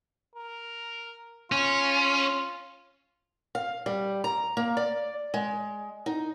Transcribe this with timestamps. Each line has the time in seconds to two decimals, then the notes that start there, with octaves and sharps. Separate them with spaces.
0.35 A#4
1.52 C#4 F4
3.55 F5
3.86 G3
4.24 A#5
4.57 A#3
4.77 D5
5.34 G#3
6.06 D#4